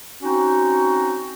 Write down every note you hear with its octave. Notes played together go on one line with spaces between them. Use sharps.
C4 C#4 D#4 F#4